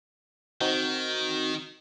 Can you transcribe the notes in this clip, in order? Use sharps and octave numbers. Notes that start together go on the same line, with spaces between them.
D#3 C4 D#4 F#4